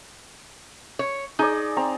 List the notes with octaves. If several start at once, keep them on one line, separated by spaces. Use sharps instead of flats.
C#5
D#4 G#4 D5
C4 A#5